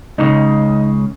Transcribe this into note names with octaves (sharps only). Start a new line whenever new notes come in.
C#2 A2 C#3 D#4